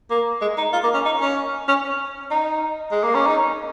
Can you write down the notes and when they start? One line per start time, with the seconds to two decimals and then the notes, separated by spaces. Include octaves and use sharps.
0.11 A#3
0.41 G#3
0.58 D#4
0.73 F4
0.84 A#3
0.94 C#4
1.06 D#4
1.21 C#4
1.68 C#4
2.31 D#4
2.92 G#3
3.04 A#3
3.15 C#4
3.26 D#4